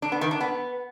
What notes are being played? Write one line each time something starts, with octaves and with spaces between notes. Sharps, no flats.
D4
B3
D#3
D4
B3